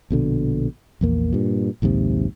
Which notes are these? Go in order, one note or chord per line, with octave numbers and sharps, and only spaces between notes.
A#1 B2 D3
A#1 E2 A#3
G2 A#2
A#1 D#2 G#2 C3